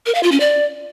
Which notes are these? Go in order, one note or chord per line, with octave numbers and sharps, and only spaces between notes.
A#4
F5
F4
C#4
D5